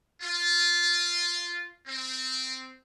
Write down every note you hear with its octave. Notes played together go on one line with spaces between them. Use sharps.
F4
C4